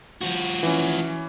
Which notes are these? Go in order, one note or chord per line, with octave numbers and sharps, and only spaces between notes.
F3 F#4
E3 C#4